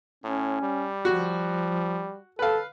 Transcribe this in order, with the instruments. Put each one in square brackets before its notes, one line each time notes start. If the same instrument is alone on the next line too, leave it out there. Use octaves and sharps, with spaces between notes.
[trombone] A2 [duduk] C#4
[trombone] G3
[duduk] F3 [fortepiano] F#4
[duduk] A4 [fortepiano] B4 F5